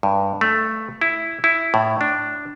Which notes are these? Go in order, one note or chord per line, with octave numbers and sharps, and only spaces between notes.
G2
A3
E4
E4
A2
D4